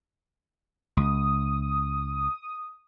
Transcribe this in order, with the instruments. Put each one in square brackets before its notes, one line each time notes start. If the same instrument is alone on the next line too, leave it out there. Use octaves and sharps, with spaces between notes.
[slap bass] C#2 [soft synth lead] D#6